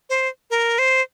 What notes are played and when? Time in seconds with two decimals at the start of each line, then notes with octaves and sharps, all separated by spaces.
0.09 C5
0.50 A#4
0.79 C5